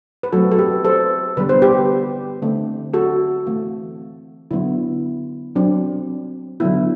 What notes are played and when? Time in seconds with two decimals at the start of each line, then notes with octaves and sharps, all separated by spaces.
0.23 B4
0.33 F#3 A3 C4 F#4 A4
0.52 A4
0.59 G4 B4
0.85 A4 C5
1.37 D3 G3 B3 B4
1.49 C5
1.62 G4 B4
2.42 D3 A3 C4
2.94 F#4 A4
3.46 E3 A3 C4
4.51 D3 F#3 B3 E4
5.55 F#3 C4 D4
6.60 D3 F#3 B3 E4